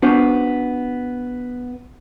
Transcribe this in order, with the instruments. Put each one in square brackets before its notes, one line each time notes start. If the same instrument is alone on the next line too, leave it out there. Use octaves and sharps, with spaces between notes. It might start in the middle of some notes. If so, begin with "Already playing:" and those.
[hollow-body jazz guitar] B3 C#4 D4 F#4 C5